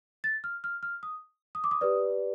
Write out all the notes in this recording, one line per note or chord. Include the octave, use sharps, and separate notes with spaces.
A6
F6
F6
F6
D#6
D#6
D6
D#6
G4 B4 D5